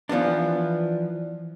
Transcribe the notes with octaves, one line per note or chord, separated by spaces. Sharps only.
E3 F3 B3 D4